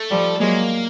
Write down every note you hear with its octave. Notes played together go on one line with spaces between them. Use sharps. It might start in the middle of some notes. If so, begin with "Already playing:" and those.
Already playing: A3
F3 G3
F#3 G#3 A#3